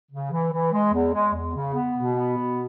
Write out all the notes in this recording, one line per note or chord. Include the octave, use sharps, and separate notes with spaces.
C#3
E3
E3
G#3
E2
G#3
E2
C#3
B3
B2
B3
B2